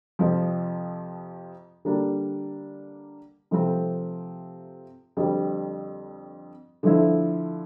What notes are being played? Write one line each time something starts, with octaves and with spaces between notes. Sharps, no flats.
F2 C3 F3
D3 G3 A#3 D4
C3 F3 A3 C4
F2 D3 G3 C4
D3 F3 A3 E4